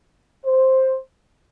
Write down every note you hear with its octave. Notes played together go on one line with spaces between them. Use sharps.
C5